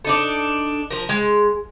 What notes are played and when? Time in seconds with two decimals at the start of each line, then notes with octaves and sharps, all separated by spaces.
0.05 D4 D#4 A4
0.90 F3 A#4
1.09 G#3